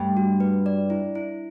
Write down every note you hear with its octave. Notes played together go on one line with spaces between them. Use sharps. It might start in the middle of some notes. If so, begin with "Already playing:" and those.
Already playing: G2 A3
F#4
B4
D5
E4
E4